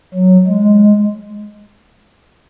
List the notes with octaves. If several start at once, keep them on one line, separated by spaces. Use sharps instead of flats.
F#3
G#3